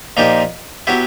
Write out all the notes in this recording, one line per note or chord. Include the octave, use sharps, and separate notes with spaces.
A#2 F3 A#3 D#4 G4
F#3 B3 E4 G4